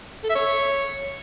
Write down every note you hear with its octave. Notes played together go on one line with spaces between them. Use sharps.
A4
E5
C#5